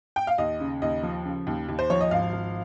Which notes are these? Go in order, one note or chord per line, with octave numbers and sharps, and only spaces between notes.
G5
F5
D#2 D#5
C#3
D#2 D#5
F3
C#3
D#2
D#2
C5
F3 C#5
D#5
G#1 F5
F3